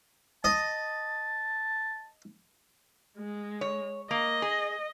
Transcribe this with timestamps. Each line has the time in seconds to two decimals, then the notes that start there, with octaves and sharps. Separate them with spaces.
0.44 D#5 A5
3.18 G#3
3.61 C#5
4.11 A#3 D#5
4.42 G#4